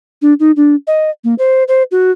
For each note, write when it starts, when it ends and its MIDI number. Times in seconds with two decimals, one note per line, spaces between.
0.22 0.34 62
0.39 0.51 63
0.56 0.75 62
0.87 1.10 75
1.24 1.34 58
1.38 1.63 72
1.68 1.83 72
1.91 2.11 66